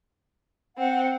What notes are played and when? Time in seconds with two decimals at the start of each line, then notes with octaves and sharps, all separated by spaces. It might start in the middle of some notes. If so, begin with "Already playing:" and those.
0.77 C4 F#5